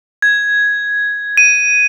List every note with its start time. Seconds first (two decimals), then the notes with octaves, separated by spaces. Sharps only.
0.22 G#6
1.37 D#7